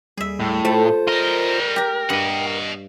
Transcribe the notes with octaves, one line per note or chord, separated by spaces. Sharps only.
D#2 G3 G#4 E5
A2
A3 F4 C5
G3 A#4 D#5
G4 G5 A#5
G2 D#5 F#5